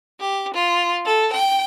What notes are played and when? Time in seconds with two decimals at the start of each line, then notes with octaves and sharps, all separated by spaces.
0.21 G4
0.54 F4
1.05 A4
1.34 G5